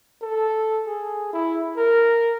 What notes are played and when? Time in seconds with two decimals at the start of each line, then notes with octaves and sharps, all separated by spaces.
0.22 A4
0.86 G#4
1.33 E4
1.77 A#4